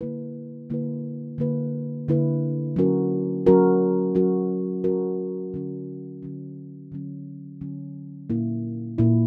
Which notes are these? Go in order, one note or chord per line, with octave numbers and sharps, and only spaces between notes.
D3 A#3 E4 B4
D3 A#3 E4 B4
D3 A#3 E4 B4
D3 A#3 E4 B4
F#3 C#4 F#4 A#4
F#3 C#4 F#4 A#4
F#3 C#4 F#4 A#4
F#3 C#4 F#4 A#4
D3 F#3 C#4
D3 F#3 C#4
D3 F#3 C#4
D3 F#3 C#4
A#2 A#3 E4
A#2 A#3 E4